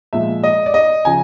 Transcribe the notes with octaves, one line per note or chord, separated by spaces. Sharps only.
A#2 F3 G#3 E5
D#5
D5
D#5
C#3 F3 G#5